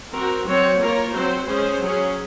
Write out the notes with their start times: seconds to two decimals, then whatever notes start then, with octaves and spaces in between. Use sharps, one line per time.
0.13 C4 F#4 A#4
0.46 F#3 C4 F#4 C#5
0.80 A#3 F4 A#4 C#5
1.14 F#3 C4 F#4 C5
1.48 G#3 C#4 G#4 C5
1.81 F#3 C#4 G#4